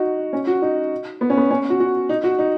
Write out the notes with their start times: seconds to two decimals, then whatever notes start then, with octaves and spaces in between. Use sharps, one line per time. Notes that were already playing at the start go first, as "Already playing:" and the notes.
Already playing: D#4 F#4
0.33 C#4
0.47 F#4
0.62 D#4
1.21 B3
1.30 C#4
1.37 B3
1.51 C#4
1.70 F#4
1.80 F#4
2.09 D#4
2.24 F#4
2.39 D#4